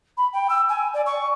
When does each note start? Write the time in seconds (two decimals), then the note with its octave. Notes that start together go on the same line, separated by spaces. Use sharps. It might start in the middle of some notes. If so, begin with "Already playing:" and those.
0.17 B5
0.33 G5
0.50 E6
0.69 G#5
0.94 D5
1.06 C#6